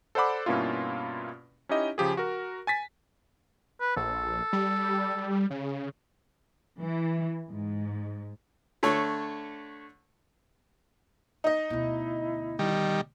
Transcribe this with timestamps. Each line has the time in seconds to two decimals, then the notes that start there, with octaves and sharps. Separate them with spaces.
0.15 A4 C5 D5 F#5 B5 D6
0.46 G2 B2 A#3 C#4 E4 F4
1.69 C#4 D#4 E4 G4 D#5
1.98 C#3 F3 G4 G#4
2.17 F#4 A#4
2.67 G#5 A6 B6
3.80 B4
3.96 A#1 A4
4.53 G3
5.50 C#3
6.80 E3
7.50 G#2
8.83 D3 A3 A4 C#5
11.44 D#4 D#5
11.70 D2 B2 E4
12.59 D#3 G3